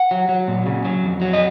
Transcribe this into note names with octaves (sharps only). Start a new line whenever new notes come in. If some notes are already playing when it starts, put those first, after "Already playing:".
Already playing: F#5
F#3
F#3
A#2
C#3
F#3
F2
F#3
D#5